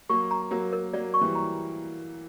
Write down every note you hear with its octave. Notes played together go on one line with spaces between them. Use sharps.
F#3 A#3 C#6
A#5
F#3 A#3 A#4
A#4
F#3 A#3 D5
C#6
E3 G3
A#5